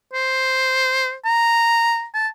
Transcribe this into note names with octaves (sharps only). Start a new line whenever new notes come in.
C5
A#5
A5